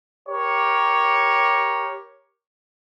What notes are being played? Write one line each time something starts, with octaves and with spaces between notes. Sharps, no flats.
G4 A#4 C#5